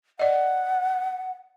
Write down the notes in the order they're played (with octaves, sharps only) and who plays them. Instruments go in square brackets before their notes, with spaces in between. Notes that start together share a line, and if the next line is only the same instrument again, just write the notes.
[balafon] D5 D#5 [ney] F#5